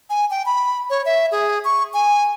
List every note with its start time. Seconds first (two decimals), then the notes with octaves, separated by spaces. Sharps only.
0.10 G#5
0.30 G5
0.46 B5
0.90 C#5
1.06 E5
1.32 G#4
1.65 C#6
1.94 G#5